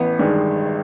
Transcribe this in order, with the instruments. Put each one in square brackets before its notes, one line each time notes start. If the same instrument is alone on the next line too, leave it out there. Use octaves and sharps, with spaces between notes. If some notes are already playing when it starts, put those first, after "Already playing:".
Already playing: [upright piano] A1 [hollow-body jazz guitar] B3
[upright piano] G2 D#3 G#3